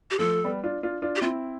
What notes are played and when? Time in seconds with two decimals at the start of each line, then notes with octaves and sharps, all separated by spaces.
0.11 G4
0.19 F3 A3 A4
0.44 G3 B3
0.64 D4 F4
0.83 D4 F4
1.02 D4 F4
1.16 G4
1.21 C4 E4 F4